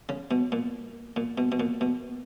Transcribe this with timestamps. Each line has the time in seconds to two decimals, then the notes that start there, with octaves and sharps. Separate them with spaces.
0.09 C#3
0.31 B2
0.52 A#2
1.16 A#2
1.38 B2
1.52 B2
1.60 A#2
1.81 B2